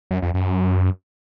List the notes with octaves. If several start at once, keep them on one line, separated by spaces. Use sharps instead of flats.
F#2
F2
F#2